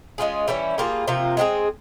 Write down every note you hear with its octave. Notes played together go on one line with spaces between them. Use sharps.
G#3 C#4 F4 G#4
E3 G3 C#4 E4
G3 A#3 F4 G#4
C3 F3 A#3 F4
G#3 C4 F4 G#4